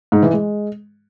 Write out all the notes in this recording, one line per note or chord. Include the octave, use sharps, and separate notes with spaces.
G#2
E3
G#3